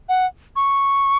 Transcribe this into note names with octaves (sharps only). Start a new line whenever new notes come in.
F#5
C#6